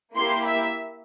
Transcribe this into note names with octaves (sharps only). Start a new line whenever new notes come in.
A#3 E4 G4 C6
E5